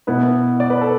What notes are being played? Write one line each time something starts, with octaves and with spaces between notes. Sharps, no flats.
B2 B3 E4 B4
D5
B4
A4